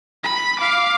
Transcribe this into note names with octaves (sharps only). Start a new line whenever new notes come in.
B5 B6
F5 D6